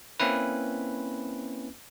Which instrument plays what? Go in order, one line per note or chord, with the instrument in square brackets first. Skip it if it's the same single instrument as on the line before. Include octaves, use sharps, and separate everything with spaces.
[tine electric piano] A#3 C4 C#4 E4 B4